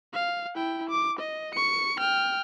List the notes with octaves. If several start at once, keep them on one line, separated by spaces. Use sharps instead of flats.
F5
E4 G5
D6
D#5
C#6 C#7
G5 F6